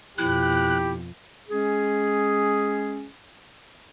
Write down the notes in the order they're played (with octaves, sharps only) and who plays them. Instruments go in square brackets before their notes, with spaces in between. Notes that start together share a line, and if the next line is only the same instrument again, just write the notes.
[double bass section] F2 B2 F3 [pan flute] E4 [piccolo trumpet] G4 [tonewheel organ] F#6
[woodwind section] G#3 C#4 G#4